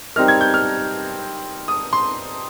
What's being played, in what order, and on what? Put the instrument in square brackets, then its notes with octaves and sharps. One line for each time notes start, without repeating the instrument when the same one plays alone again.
[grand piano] G3 C4 D#4 A#4 [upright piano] F6
[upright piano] G#6
G6
F6
D#6
C6